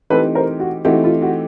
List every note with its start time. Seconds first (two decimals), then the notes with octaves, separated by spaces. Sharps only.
0.10 E3 A3 C4 D#4 G4 A4 B4
0.35 A#4 C5
0.60 F#4
0.85 E3 A3 C4 D#4 F#4 G4
1.04 F4
1.22 F#4